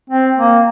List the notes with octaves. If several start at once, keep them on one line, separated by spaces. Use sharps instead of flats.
C4
A#3